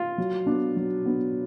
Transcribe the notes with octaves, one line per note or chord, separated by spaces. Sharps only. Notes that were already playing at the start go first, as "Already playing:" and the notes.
Already playing: F4
F#3
B3 D4
F#3
B3 D4